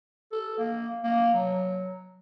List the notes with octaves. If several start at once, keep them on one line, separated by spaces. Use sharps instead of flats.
A4
A#3
A#3
F#3